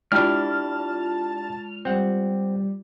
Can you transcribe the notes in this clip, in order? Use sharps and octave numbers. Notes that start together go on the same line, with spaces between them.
G#3 D4 E4 F4 G4 A5 F6
G3 C4 F#5